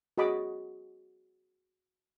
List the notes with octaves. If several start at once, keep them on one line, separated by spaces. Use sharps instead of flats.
F#4 G#4 D#5 B5 D6